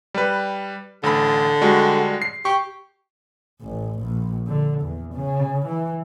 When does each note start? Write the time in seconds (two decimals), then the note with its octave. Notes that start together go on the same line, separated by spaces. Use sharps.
0.14 G3 B4
1.03 A1 D3 B5
1.61 G3 G#3 F#4
2.22 C7
2.45 G4 C#6
3.62 A1
4.00 A#1
4.47 D3
4.81 E2
5.14 C#3
5.67 E3